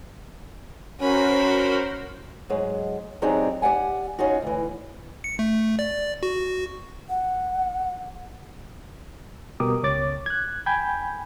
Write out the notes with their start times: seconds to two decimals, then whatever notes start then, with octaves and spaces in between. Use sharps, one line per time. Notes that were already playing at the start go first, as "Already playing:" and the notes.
0.99 C#4 F#4 A#4 C5 B5
2.49 G#2 F#3 G#3
3.22 F#3 C4 D4 D#4 G4 G#4
3.62 G4 G#4 D5 F#5 G#5
4.19 C#4 D#4 F4 F#4
4.42 D2 E3
5.24 C#7
5.39 A3
5.79 D5
6.23 F#4
7.09 F#5
9.60 B2 G3 G4 A#4 D6 D#6
9.83 C#2 C#5 D6 A6
10.26 F#6 G#6
10.66 G5 G#5 B5 G6 G#6